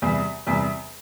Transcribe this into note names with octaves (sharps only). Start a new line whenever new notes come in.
E2 C3 G3
E2 C3 G3